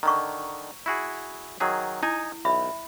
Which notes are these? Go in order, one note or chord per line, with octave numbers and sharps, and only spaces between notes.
D3 D#3 A#5 C#6
E4 F#4 G#4
D#3 F#3 G#4
D#4 E4 G#5
B1 E5 B5